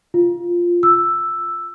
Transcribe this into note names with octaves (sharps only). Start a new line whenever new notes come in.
F4
E6